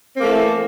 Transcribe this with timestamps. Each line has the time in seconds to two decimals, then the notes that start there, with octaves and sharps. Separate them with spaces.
0.15 C4
0.19 A#3
0.23 A3
0.27 E3